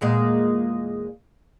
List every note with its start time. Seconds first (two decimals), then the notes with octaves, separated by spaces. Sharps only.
0.01 E2 A#2 G#3